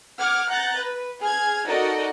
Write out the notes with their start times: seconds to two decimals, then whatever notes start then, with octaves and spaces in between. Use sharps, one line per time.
0.18 F#5 D6 F6 G#6
0.49 F#5 A#5 F#6 G6 A6
0.77 B4
1.20 G#4 F6 G#6
1.66 D#4 F#4 A4 A#4 D5 D#5